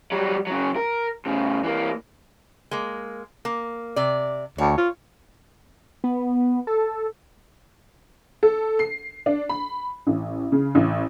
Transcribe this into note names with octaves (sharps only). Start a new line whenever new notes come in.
F#3 G3
C#3 F#3
A#4
A2 C#3
E3 A#3
G#3 A#3
A#3
C3 D5
D2 C#5
F4
B3
A4
A4
C7
D4
B5
A1
C#3
A1